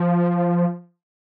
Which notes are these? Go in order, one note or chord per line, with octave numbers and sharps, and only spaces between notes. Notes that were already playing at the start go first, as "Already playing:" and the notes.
Already playing: F3